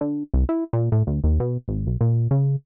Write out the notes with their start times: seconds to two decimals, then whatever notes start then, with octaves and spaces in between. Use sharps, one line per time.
0.01 D3
0.34 C2
0.49 E4
0.73 A#2
0.92 A2
1.07 D2
1.24 D#2
1.40 B2
1.68 G#1
1.87 B1
2.01 A#2
2.31 C#3